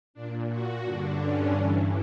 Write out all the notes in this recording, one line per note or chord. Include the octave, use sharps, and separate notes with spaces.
A#2 D4
F#4
G2 D3 D4
C#4
G2 E3